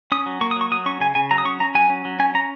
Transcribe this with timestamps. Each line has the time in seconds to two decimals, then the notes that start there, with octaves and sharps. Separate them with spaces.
0.12 C#4 D#6
0.26 F#3
0.41 A#3 C#6
0.51 D#6
0.56 F#3 C#6
0.72 F#3 D#6
0.86 C#4 C#6
1.00 C#3 G#5
1.15 C#3 G#5
1.31 F#3 A#5
1.38 D#6
1.45 C#4 C#6
1.60 C#4 A#5
1.75 F#3 G#5
1.90 C#4
2.05 F#3
2.19 C#4 G#5
2.34 C#4 A#5